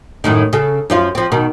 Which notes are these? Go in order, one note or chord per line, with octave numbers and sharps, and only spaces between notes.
F#2 A2 D#3
C#3 A4
F#2 F3 F4
F3 C4
B2 D#3